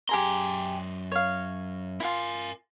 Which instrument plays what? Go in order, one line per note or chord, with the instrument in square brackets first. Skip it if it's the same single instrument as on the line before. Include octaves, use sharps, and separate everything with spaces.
[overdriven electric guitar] F#2 C6 [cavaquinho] G4 G#4 A#5
[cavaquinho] C#5 F5
[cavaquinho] E4 F4 [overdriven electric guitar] A#4 G#5